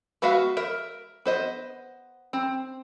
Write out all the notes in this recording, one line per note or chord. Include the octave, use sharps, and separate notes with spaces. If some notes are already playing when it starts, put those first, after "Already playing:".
G#3 B3 F#4 E5 F5
A#4 E5
B3 C5 D#5
C4